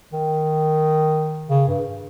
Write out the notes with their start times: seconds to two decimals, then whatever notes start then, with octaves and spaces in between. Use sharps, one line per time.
0.13 D#3
1.50 C#3
1.67 G2